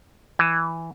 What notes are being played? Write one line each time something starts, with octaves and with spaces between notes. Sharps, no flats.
E3